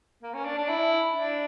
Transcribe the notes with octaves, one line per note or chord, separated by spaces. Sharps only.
A#3
C#4
D4
D4
E4
D4